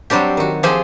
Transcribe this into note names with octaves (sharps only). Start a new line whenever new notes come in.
F#3 G3 C4 D4 G4
D#3 F#4
F3 C4 F4 G4 G#4 C5